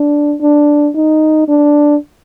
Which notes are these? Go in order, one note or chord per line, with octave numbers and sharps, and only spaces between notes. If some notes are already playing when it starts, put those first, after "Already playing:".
Already playing: D4
D4
D#4
D4